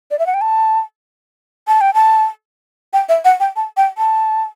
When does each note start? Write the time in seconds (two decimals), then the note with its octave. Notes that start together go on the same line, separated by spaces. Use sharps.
0.11 D5
0.19 E5
0.27 F#5
0.34 G5
0.41 A5
1.68 A5
1.81 G5
1.94 A5
2.93 G5
3.09 E5
3.25 F#5
3.40 G5
3.56 A5
3.77 G5
3.98 A5